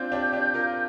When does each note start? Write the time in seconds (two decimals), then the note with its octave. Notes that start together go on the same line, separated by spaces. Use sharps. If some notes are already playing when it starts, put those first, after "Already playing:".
Already playing: C4 D4 F4 G6
0.12 D4 G4
0.33 D4 G4
0.54 F4 A#4